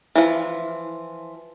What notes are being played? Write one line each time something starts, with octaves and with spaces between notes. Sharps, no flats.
E3 F3